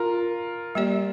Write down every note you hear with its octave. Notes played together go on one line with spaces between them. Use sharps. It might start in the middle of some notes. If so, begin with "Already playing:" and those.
Already playing: F4 A#4
G3 A#3 G4 D5